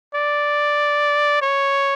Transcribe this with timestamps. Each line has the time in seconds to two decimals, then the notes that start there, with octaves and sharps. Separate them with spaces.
0.15 D5
1.42 C#5